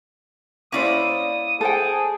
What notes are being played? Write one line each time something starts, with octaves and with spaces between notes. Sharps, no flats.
A#3 C#4 E4 C5 D5 D#6
G#4 A4 C5 G5